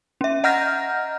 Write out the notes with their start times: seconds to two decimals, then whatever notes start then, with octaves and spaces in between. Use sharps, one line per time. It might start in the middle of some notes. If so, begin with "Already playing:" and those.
0.21 C#4 E5
0.44 D#5 F#5 A#5 F6 G6 A#6